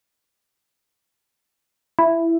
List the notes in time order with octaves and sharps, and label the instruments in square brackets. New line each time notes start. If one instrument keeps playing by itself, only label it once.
[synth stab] E4